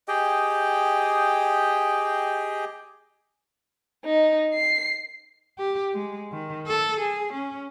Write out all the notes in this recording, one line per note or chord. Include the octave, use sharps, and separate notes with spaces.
G4 G#4 D#5 G5
D#4
C7
G4
G#3
D#3
A4
G#4
C#4